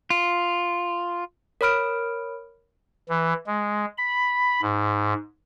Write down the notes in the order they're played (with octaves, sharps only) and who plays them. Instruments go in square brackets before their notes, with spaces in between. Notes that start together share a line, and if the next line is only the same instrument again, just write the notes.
[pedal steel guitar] F4
[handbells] A#4 C#5 B5 F6 D7
[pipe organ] E3
G#3
B5
G#2